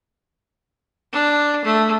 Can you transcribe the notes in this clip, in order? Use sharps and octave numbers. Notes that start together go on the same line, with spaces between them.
D4
A3